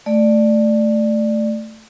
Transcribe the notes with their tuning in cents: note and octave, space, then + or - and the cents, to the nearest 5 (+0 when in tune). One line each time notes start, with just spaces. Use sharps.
A3 +0 D5 +10